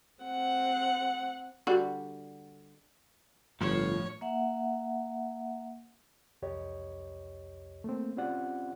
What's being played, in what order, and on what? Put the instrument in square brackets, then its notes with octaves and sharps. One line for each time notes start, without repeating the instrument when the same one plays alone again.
[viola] C4 F#5
[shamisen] D3 G3 F#4
[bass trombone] G1 [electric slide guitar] A2 F3 [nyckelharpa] C#5
[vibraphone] A#3 E5 F#5
[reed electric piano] C2 F2 G4 C#5 D#5
A3 A#3 C4
C4 C#4 F4 G4 D5 F#5